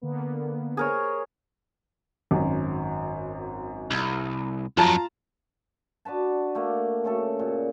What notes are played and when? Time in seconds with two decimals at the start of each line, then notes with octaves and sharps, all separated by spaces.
0.02 D3 A#3 B3
0.77 G#4 A#4 C#5
2.31 G#1 F#2
3.91 C2
4.77 F2 F#3 F4 A5 A#5
6.05 D4 F#4 B4 A5
6.55 A3 A#3
7.04 C#3 A3 A4
7.39 A#2